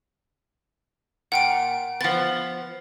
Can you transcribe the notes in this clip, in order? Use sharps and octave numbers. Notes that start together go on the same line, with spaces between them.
A#2 F#5 G5 D7
F3 B3 A6